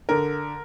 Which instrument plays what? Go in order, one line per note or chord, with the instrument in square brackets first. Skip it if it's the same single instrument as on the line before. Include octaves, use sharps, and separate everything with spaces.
[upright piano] D3 A#4